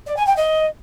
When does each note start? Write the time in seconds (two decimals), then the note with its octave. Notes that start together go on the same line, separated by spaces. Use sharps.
0.06 D5
0.16 G#5
0.26 G5
0.36 D#5